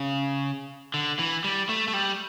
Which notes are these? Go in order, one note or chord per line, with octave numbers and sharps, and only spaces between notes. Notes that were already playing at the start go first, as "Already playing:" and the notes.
Already playing: C#3
D3
E3
G3
A3
A3
G3